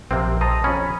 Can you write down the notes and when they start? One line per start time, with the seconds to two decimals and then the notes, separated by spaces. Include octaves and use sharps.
0.11 A#1 C3 A#3 C4
0.41 A4 C5 D#5 A5 A#5 D#6
0.64 F2 C#4 B5